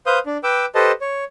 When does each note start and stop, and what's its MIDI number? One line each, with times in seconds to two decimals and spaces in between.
0.06 0.19 71
0.06 0.19 72
0.06 0.19 77
0.06 0.19 87
0.06 0.19 91
0.26 0.37 62
0.44 0.66 71
0.44 0.66 79
0.44 0.66 86
0.44 0.66 88
0.75 0.92 67
0.75 0.92 69
0.75 0.92 71
0.75 0.92 72
0.75 0.92 75
0.75 0.92 81
1.01 1.24 73